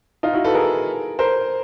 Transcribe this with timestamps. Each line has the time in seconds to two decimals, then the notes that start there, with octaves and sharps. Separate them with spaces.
0.23 D#4 F4
0.33 E4 F#4
0.44 A4 B4
0.55 G#4 A#4
1.19 A#4 C5